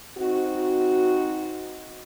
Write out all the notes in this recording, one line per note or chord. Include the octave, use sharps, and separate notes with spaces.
C4 D#4 F#4